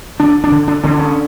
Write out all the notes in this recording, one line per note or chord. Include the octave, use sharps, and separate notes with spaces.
D3 D4
D4
D3
D4
D3 C#4
D4
C#4